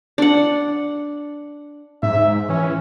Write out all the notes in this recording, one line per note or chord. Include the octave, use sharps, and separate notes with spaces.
D4 F#5
G#2 E5
E3 C#4